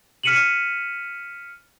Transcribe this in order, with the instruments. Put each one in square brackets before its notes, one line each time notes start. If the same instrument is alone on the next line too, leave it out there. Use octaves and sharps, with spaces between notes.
[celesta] F6 B6 C#7 D#7 E7 F#7